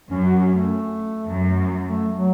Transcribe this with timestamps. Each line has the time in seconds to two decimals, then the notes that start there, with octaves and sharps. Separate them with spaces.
0.10 F#2 C#4
0.25 F#4
0.40 C#4
0.54 A3
1.28 F#2
1.87 A3
2.16 F#3